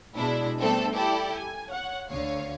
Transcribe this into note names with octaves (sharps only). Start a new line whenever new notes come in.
B2 G#3 D4 E4
G3 A3 B3 C4 D4 A4
E4 G4 A4 D5
G#5
C#5 F#5
D2 D3 C#5 F5